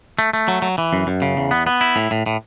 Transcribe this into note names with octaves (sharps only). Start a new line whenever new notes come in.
A3
A3
F#3
F#3
E3
F#2
F#2
C#3
E2
B3
B3
E4
A2
A2
A2